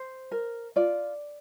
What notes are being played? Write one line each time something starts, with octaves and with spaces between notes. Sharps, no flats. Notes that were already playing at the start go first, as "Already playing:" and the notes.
Already playing: C5
A#4
F4 D5